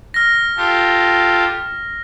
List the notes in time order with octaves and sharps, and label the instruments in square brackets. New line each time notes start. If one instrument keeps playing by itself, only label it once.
[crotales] F6 A#6
[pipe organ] F4 G4 A4